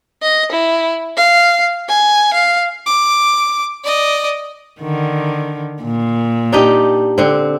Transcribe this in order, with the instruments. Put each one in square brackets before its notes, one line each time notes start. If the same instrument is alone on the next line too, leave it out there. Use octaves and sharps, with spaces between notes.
[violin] D#5
E4
F5
G#5
F5
[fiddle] D6
D5 D#5
[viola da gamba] D3 D#3
A#2
[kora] D4 D#4 G4
D3 C4